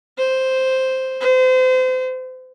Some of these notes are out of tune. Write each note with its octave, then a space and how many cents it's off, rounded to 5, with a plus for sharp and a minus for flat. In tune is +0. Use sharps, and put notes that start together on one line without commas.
C5 +0
C5 -35